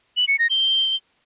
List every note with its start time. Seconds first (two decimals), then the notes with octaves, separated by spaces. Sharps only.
0.17 F#7
0.28 C#7
0.39 A#6
0.50 G7